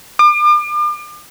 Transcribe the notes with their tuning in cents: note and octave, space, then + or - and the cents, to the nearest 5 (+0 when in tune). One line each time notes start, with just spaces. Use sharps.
D6 +40